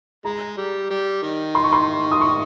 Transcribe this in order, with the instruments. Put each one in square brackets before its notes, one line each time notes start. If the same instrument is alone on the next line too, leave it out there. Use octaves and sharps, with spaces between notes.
[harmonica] G#3 [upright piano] A#5
[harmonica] G3
G3
D#3
[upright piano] C6
C#6
C6
D#6
C#6